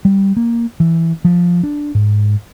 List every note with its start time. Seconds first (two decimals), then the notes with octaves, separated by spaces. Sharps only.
0.05 G3
0.37 A#3
0.80 E3
1.25 F3
1.63 D4
1.95 G#2